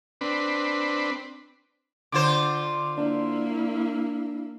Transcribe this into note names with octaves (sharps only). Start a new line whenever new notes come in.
C4 D4 B4
D3 F4 C5 D6
A#3 D4 E4